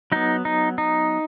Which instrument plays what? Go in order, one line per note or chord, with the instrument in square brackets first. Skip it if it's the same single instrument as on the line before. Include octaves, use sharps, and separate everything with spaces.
[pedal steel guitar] F#3 B3 D#4
D#4
D#4